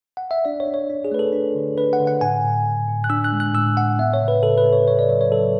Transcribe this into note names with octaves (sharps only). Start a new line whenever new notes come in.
F#5
E5
D4 D5
C#5
D4
C#5
D4
G#4
A3 B4
A4
D4
D3
D4 B4
F#5
D3
F#5
A2 G#5
A2
A2
A2
F#6
D4 E6
F#6
G#3
F#6
A2 E6
A2 F#5
B3 E5
C#5
C#3
B4
C#3 A4
B4
B3
C#5
C#3 C#5
D5
F#3 C#5
C#5
F#3 A4